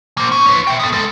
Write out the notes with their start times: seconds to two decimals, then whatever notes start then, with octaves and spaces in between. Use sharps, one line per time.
0.18 A#3 C5
0.32 C#4
0.46 B4 C#5
0.67 E5 G5
0.80 B3 A4
0.93 G#3 A4